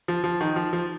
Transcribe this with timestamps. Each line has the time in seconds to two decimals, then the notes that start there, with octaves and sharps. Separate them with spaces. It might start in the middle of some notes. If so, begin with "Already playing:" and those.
0.08 F3
0.24 F3
0.41 D#3
0.56 F3
0.73 F3